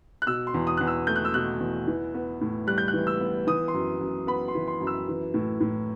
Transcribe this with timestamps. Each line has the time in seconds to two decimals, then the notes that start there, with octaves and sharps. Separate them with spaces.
0.22 F#6
0.27 B2 E6
0.47 C6
0.54 E2
0.67 D#6
0.77 E2 F#6
0.87 E6
1.07 A3 G6
1.16 F#6
1.25 E6
1.34 B2 F#6
1.60 E2
1.87 E3
2.14 B3
2.41 A2
2.67 G3 F#6
2.78 G6
2.88 F#6
2.93 E3
3.07 E6
3.20 B3
3.47 E3 D#6
3.68 C6
3.74 F#2
4.01 F#2
4.27 B3 B5
4.48 C6
4.55 E3
4.68 C6
4.81 F#2
4.87 E6
5.08 E3
5.34 A2
5.60 A2